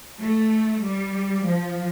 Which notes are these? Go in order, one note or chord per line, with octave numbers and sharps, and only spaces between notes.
A3
G3
F3